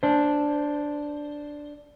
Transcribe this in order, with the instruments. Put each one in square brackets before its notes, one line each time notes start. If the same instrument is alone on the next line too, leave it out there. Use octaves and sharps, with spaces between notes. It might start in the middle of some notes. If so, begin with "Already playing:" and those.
[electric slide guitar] D4 C5